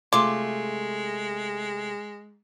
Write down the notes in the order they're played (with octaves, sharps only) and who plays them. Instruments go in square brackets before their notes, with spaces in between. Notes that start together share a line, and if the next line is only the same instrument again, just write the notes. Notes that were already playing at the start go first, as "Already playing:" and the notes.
[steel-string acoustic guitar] C3 A3 [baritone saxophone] G#3 [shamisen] F4 [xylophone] D6